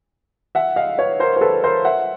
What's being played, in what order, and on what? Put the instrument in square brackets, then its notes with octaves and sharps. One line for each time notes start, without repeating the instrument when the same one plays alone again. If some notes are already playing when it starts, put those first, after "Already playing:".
[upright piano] E5 F#5
D#5 F5
B4 C#5
A#4 C5
C5
A4 B4
A#4 C5
E5 F#5